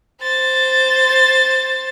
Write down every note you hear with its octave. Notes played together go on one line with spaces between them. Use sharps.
C5 A6